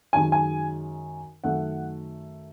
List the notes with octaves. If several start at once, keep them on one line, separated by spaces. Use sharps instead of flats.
F#2 D#3 G#3 G#5
G#5
F#2 D#3 A3 F#5